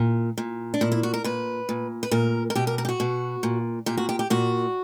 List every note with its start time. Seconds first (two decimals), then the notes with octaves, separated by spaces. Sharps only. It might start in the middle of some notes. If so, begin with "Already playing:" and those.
Already playing: A#2
0.38 A#2
0.74 D4
0.81 A#2 E4
0.92 E4
1.03 F#4
1.14 A#4
1.24 A#2 B4
1.69 A#2
2.03 B4
2.11 A#2 A#4
2.50 A#4
2.55 B2 G4
2.67 A#4
2.78 A#4
2.85 G4
2.89 F#4
3.00 B2
3.43 A#2
3.86 A#2 G4
3.97 F#4
4.09 G4
4.19 G4
4.30 A#2 F#4